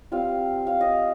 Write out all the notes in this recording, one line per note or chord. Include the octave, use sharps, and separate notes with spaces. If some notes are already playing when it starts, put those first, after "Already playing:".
G3 C4 F4 F5
F5
D#5